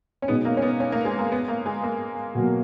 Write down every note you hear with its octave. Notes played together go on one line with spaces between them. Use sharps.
C#4
B2 G#3 B3 D#4
A#3
C#4
B3
C#4
A#3
G#3
A#3
B3
A#3
G#3
A#3
B2 F#3 A#3